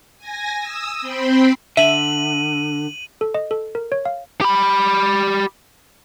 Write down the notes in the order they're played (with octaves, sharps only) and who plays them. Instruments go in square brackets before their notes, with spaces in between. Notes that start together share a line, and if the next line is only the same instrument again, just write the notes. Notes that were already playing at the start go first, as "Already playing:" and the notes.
[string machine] G#5 A#6
D#6 E6
C4 G5 B5 C6
[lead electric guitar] D3 [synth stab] E5 [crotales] D#7 F#7
[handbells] A4
D#5
A4
A#4
C#5
F5
[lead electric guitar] G4 B5